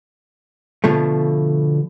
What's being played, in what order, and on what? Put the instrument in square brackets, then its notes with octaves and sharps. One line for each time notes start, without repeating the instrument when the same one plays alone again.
[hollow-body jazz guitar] B2 D3 F3 A3